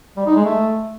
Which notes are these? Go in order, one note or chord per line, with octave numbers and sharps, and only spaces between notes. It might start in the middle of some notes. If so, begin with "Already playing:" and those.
G3
D#4
G#3
A3